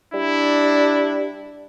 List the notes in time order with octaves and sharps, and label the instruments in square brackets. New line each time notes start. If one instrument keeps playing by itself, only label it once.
[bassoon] G3 [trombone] D4 [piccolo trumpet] E4